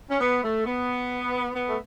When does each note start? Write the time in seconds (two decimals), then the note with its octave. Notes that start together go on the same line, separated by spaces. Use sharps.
0.10 C#4
0.21 B3
0.44 A3
0.66 B3
1.55 B3
1.68 A3